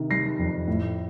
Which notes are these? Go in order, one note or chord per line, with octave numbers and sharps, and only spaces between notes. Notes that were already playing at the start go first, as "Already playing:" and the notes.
Already playing: C3 D#3
G3 A#6 C7
F2
A2